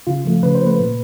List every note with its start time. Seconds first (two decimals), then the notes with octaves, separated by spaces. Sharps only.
0.07 C#3 F4
0.25 F3 A3
0.43 C#3 B4
0.55 C5
0.62 F3 A3 B4
0.79 A#2